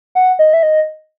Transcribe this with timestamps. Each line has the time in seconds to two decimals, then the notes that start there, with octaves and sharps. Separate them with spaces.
0.15 F#5
0.39 D#5
0.53 E5
0.63 D#5